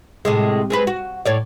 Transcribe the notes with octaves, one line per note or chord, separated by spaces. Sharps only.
A2 C3 G#3
G#3 C4 B4
F#4
A2 C#5 D5